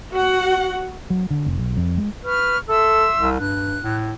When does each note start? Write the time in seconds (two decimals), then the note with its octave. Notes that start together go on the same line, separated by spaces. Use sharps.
0.13 F#4 F#5
1.10 F#3
1.31 D3
1.46 F1
1.58 B1
1.77 F2
1.98 G#3
2.25 B4 C#6 F6
2.69 A4 E5 C6 E6
3.19 C2
3.40 G2 F#6
3.84 A2